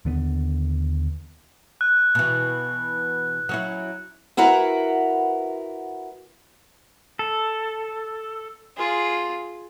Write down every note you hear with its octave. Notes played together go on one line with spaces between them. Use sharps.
D#2 D3 B3
F#6
B2 E3
F#3 C#4 E4
E4 F#4 A#4 B4 F#5
A4
F4 G#4